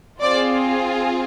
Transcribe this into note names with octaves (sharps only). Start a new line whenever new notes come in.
C4 F4 G#4 C5 D5